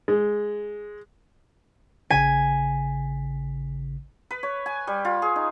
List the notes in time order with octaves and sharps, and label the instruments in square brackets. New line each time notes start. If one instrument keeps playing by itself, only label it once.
[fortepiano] G#3
[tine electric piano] A1 C#3 B6 [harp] G#5
[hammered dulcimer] B4
C#5
G#5
G3
F4
G#4
D#4